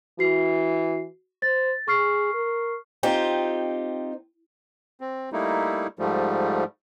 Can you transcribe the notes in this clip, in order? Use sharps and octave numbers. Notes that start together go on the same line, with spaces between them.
E3 F#4 C7
C5 A6
G#4 C#6 F6 C7
A#4
C4 D#4 F4 G4
C4
G3 A3 A#3 D#4 E4
G#2 F3 G3 A3